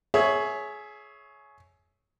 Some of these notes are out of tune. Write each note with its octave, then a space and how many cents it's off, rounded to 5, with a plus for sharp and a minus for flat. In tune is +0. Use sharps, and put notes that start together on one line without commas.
G#4 +20 C#5 +0 E5 +0